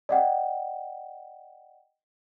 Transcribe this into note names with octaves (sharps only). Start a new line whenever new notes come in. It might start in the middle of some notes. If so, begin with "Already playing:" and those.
D5 D#5 F#5 G5